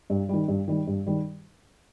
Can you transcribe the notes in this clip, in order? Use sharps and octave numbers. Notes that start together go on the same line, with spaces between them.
G2
D#3 G3
G2
D#3 G3
G2
D#3 G3